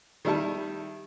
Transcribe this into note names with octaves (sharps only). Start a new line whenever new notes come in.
D#3 G3 E4 A5